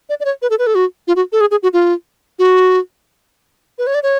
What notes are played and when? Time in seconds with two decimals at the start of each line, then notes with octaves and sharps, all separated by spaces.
0.09 D5
0.20 D5
0.25 C#5
0.42 B4
0.50 A4
0.59 B4
0.67 A4
0.75 F#4
1.08 F4
1.16 F#4
1.32 A4
1.41 G#4
1.51 G#4
1.63 F#4
1.73 F4
2.39 F#4
3.78 B4
3.87 C#5
3.95 D5
4.03 C#5